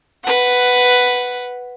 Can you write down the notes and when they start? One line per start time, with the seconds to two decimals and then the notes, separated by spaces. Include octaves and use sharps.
0.24 B4 F#5